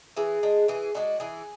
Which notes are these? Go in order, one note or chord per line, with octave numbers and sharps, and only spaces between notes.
E3 G#4
G#3 D4
E3 G#4
G#3 D4 F#4
E3 G#4